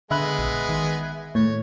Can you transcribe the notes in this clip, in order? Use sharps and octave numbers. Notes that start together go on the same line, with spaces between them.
D3 G#3 B3 E5 B5 F#6
A#1
D#3
A2 C#5